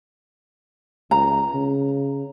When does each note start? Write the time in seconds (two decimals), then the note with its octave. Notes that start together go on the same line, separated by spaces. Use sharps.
1.11 C#2 A#5
1.54 C#3